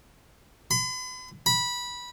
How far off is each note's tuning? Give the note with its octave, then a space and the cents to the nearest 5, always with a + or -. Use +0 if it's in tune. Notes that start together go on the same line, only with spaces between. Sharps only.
B5 +45
B5 -15